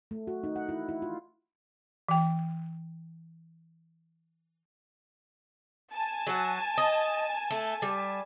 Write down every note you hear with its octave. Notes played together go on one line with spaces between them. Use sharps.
A3
F#4
D#4
F#5
E4
E4
F4
E3 G5
G#5 A5
F#3 F#5
D#5
A3
G3